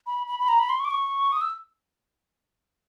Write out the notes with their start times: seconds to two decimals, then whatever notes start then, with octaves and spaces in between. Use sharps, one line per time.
0.07 B5
0.27 B5
0.40 B5
0.48 A#5
0.59 B5
0.69 C6
0.80 C#6
0.85 D6
0.90 C#6
1.32 D#6
1.41 E6